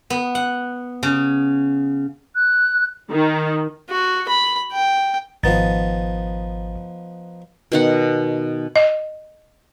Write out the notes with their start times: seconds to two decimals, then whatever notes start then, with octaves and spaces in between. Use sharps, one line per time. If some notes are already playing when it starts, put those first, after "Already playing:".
0.10 B3
0.35 F#5
1.03 C#3
2.35 F#6
3.10 D#3
3.89 F#4
4.28 B5
4.72 G5
5.43 G#1 F3 B3 D#4 A6
7.72 B2 D#3 F#5
8.76 D#5